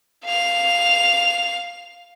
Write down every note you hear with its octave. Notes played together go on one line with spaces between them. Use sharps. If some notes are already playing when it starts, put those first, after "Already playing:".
F5 F7